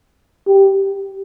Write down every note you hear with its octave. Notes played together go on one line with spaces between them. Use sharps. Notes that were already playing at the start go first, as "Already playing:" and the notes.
G4